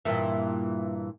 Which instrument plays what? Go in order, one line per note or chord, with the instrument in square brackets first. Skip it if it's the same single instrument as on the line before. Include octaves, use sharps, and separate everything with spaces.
[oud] G2 A#2 E3